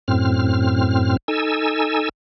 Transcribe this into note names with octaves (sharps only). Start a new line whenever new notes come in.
F#2 A2 C4 F6
D#4 A4 G#5 E6